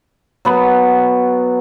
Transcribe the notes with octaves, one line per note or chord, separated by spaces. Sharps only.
F#3 B3